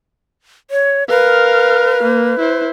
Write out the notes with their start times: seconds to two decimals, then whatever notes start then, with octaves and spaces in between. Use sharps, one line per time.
0.71 C#5
1.09 A#4 B4 F5
2.03 A#3
2.39 E4 C5